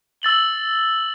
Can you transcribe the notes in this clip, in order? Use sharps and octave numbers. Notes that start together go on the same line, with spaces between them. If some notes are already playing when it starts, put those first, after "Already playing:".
E6 A6 F#7 G7